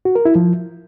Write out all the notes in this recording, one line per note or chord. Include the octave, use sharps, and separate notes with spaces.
F#4
A#4
E4
F3